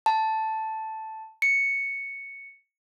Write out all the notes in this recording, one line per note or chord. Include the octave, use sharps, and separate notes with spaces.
A5
C#7